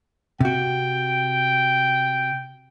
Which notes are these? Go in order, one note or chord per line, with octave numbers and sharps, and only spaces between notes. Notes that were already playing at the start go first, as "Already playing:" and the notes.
C3 F#4 G5